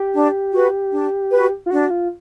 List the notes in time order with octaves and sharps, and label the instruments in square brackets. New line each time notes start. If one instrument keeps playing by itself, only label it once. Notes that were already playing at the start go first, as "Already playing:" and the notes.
Already playing: [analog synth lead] G4
[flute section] D4
F#4 B4
D4
F#4 B4
[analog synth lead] F4
[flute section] D4 [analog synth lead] F#4
[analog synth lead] F4